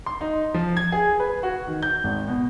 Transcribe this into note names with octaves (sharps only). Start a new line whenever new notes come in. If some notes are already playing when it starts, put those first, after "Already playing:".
C6
D#4
F3
G#6
G#4
B4
F#4
D#3
G6
G#1
B2